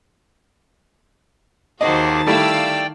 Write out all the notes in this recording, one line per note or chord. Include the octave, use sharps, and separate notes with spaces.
D#2 D#3 F#4 G#4 C5 D#5 A5 D6
G3 A3 E4 D5 F5 G5 D6 E6